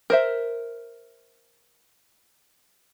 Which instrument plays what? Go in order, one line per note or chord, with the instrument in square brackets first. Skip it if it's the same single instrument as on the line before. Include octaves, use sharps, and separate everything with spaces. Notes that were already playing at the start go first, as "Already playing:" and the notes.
[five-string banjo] A#4 C5 E5